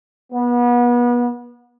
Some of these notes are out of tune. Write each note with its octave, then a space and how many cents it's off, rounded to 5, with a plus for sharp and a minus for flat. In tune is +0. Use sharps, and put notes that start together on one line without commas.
B3 -30